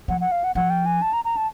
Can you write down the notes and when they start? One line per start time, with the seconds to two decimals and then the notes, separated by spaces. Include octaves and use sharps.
0.08 F3 F#5
0.21 F#5
0.32 F5
0.44 F#5
0.55 F3 F#5
0.70 G5
0.86 G#5
1.02 A5
1.13 A#5
1.25 A#5
1.37 A5